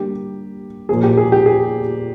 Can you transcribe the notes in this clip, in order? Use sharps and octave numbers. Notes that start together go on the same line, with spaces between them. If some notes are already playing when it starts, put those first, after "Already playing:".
Already playing: D3 G3 A#3 G4
A#2 F3 A#3 G#4
G4
G#4
G4
G#4